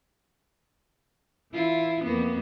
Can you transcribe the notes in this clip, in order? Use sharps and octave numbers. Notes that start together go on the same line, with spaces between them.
E3 E4 F4
F2 A#3 B3